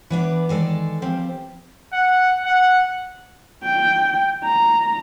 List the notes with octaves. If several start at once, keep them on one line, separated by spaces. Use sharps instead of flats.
E3 B3 D4
D#3 G#3 A4 D5
F3 G3 C4
F#5
F#5
G5
A#5